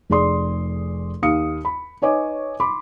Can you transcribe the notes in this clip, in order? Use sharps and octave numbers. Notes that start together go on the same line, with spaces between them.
F1 G#4 D5 C6 D#6
D#2 G4 F5 D#6 C#7
B5
D#4 B4 C#5 D#5 G#5 D6
B5 C6 D6